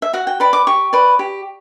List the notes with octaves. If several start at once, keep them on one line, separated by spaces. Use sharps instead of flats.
E5
F#4 F#5
G5
B4 D5 B5
D6
G4 C#6
B4 D5
G4